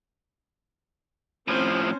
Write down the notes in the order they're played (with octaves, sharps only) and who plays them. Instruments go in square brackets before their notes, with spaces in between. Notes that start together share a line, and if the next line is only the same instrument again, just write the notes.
[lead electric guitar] A2 F3 [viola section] C4 C#4 C5